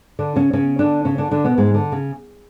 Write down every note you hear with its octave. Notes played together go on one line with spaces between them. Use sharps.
D3 D4
C#3 C#4
C#3 C#4
D3 D4
C#3 C#4
D3 D4
D3 D4
B2 B3
G#2 G#3
D3
C#3